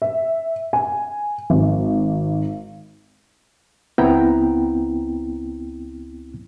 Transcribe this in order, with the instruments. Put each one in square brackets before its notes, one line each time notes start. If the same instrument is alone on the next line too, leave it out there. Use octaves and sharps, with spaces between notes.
[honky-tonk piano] E5
G#5
G#1
[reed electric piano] C#2 B3 C4 E4 G5 A#5